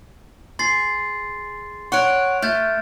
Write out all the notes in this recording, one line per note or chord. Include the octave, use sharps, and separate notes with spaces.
G#4 C6 A6 C7
C#5 F#5 C#6 F#6 D7
A3 F6 G6 A6